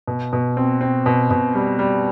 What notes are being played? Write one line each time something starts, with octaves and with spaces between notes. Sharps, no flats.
B2
B2
C4
C4
B2
B2
G3
G3